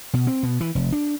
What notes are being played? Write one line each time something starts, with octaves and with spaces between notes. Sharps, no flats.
B2
C4
B2
E3
F1
D4